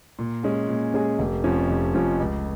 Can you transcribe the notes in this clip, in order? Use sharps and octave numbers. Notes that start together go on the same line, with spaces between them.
A#2
G#3 C#4 G#4
A#2
G#3 C#4 G#4
F1
F2 F3 C#4
F1
F2 F3 C#4
C#2